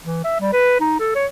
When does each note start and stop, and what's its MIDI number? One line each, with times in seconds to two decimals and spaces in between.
0.03 0.22 52
0.24 0.39 76
0.40 0.53 55
0.53 0.76 71
0.80 0.96 63
1.00 1.12 69
1.15 1.27 73